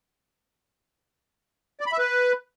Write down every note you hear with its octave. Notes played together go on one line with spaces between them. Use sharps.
D5
B5
E5
B4